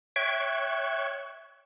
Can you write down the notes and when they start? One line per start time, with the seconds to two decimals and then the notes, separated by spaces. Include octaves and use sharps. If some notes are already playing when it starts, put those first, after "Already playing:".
0.16 C#5 E5 G5 C#6 F#6 G#6